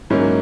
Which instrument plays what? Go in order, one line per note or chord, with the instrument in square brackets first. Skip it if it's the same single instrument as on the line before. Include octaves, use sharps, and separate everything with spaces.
[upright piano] G#2 F#3 A#3 C#4 E4